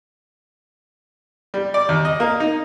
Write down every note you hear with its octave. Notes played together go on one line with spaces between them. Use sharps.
G3
D5
D#2
D#5
A#3
D#4